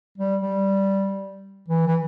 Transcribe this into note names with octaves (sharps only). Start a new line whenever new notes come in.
G3
G3
E3
E3